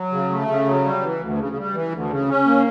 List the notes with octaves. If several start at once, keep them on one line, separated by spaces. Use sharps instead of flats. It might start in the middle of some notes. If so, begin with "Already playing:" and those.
Already playing: F#3
C#3
A3
C#3
F#3
G3
E3
D2
C#3
G3
E3
D2
C#3
C#4
A#3